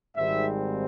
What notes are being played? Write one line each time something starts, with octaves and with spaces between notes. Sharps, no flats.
G#1 G#2 G3 C4 E5